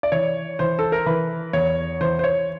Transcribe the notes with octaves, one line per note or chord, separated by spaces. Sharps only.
D5
E3 C#5
E3 C5
A4
A#4
E3 B4
E2 C#5
E3 C5
C5
C#5